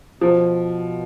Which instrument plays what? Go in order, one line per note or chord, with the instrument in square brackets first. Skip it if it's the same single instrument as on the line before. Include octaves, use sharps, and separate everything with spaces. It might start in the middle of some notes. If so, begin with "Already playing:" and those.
[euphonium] B2 [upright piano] F3